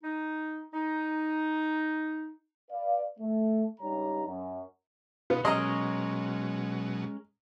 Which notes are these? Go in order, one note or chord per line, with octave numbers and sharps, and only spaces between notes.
D#4
D#4
B4 D5 F5
A3
C#2 G2 G3 D#4 C#5 A#5
F#2
B2 B3 D#4 F4
B2 F#3 G#3 C#4 A#4 D#5 A#5 C6